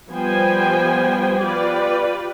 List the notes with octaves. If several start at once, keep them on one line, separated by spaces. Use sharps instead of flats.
F3 G3 B3 C5 G5 G#5
F4 G4 B4 D5